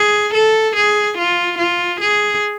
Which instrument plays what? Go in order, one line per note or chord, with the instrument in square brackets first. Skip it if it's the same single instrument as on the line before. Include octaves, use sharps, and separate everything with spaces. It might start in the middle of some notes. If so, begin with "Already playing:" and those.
Already playing: [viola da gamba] G#4
A4
G#4
F4
F4
G#4